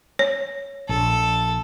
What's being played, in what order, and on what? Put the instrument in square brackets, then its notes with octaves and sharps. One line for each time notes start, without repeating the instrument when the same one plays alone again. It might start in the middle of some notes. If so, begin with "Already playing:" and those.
[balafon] C#5
[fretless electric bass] A#1 [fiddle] A4